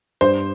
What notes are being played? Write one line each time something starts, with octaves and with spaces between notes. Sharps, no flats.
G2 C5